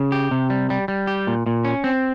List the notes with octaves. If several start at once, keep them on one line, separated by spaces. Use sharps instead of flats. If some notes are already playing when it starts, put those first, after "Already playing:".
Already playing: C#3
G4
C3
G3
G3
G3
G4
A#2
A#2
C#4
C4